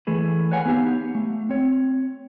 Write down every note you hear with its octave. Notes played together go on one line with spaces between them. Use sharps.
E3 A3 G#4 B4
B4 C#5 F5 F#5 G#5
B3 D#4 G4 F5
A3
C4 C#5